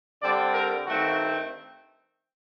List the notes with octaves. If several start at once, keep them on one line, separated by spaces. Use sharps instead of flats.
D3 G3 C4 D5
A#4
G2 D#3 A3 C4 F#4